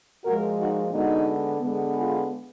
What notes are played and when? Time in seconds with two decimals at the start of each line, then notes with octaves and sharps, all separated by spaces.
0.25 A#2 F3 G#3 F#4 A#4
0.59 D#4 F#4
0.92 D3 G#3 B3 D#4 F#4
1.61 D3 G#3 B3
1.94 F4 G#4